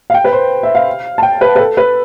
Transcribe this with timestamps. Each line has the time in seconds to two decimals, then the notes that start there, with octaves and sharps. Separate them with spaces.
0.10 F5
0.14 G5
0.24 B4
0.33 C5
0.63 E5
0.75 F5
1.18 A5
1.23 G5
1.41 B4
1.56 B4
1.59 A4
1.77 B4